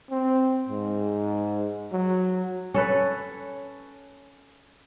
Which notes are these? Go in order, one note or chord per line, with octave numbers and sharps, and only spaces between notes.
C4
G#2
F#3
C#4 A4 B4